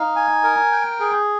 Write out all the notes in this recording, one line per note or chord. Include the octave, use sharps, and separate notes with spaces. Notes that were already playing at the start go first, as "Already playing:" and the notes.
Already playing: D#4 F5
G#5
A#4
G5
G#4